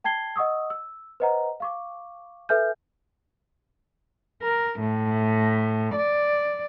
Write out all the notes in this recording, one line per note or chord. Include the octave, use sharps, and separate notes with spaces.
G5 A5 G#6 C7 G7
D#5 F#5 C#6 D#6 E6
E6
B4 C5 D#5 F#5 A#5
F5 C#6 D6
A4 B4 E5 G#5 F6 G6
A#4
A2
D5